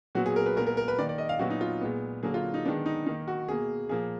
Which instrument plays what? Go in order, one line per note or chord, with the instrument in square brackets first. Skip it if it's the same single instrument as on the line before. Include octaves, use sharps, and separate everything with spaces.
[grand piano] A#2 F#3 B3 F#4
G#4
A#4
B4
A#2 G#3 B3 A#4
A#4
A#4
B4
D#3 A#3 D5
D5
D#5
F5
A#2 F#3 B3 F#4
D#4
F4
A#2 G#3 B3
D3 F#3 A#3 G#4
F4
D#4
D#3 G#3 B3 D4
D#4
D#3 A#3 D#4
F#4
B2 A#3 G#4
A#2 F3 A#3 G#4